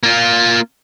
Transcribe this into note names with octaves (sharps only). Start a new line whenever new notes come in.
A#3 F4